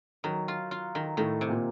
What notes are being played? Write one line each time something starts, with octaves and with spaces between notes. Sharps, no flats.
D#3 F#3
F4
F4
D#3
A2 D#3 A3
C3
A#2 A#3